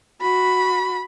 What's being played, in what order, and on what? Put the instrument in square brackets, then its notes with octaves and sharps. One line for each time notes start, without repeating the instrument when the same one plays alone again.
[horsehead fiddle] F#4 [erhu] B5